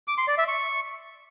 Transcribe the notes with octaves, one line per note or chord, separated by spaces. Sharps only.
D6
C6
D5
E5
C#6